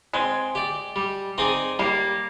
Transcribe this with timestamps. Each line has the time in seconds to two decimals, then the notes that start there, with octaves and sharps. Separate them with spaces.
0.13 G#3 C4
0.55 G4 D5
0.96 G3
1.38 C4 D#4 G#4 D5
1.79 G3 A#3